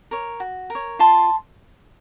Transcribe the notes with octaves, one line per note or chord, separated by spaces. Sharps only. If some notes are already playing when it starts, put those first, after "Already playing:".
A#4 C#5
F#4
A#4
C#5
F4 A5 C6